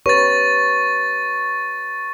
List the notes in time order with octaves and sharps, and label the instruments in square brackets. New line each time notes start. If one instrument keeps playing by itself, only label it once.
[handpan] G4 B4 C#5 [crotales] C#6 A6